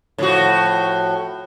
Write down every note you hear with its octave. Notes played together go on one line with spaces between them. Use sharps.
A2 F3 F#4